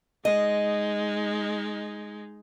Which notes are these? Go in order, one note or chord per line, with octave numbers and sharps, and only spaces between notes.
G#3 D#4 D#5